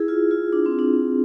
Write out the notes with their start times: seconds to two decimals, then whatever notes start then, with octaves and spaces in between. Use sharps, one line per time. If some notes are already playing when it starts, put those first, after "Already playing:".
Already playing: E4 G#4
0.08 F4
0.31 F4
0.53 D4
0.66 C4
0.79 D4